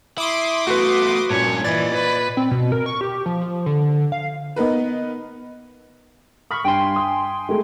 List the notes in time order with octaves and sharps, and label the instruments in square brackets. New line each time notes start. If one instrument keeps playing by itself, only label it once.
[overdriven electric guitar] E4 [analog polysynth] C6 D6 D#6
[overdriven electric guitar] A3 B3 [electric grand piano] F#4 B4
[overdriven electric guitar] G2 C#4 [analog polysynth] A#2 [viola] C#5
[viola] E3 [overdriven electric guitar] D5 D#5 [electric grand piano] G#6 A6
[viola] B4
[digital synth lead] C4
B2
A#4
C#6
G4
F3
F3
D3
F5
[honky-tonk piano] B3 D#4 A#4 B4
[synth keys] B5 C#6 [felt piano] D#6 F6 B6
[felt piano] G2 [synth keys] G5 G#5 C6
[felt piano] D#6
G#3 A3 G#4